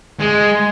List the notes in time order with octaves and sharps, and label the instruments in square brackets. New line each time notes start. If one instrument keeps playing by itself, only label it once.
[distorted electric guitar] G#3